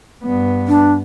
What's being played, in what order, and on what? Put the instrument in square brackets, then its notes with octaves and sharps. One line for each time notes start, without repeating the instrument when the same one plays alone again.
[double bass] G2 B3
[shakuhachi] D4